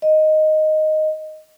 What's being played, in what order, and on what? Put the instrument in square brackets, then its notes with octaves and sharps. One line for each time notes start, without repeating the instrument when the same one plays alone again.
[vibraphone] D#5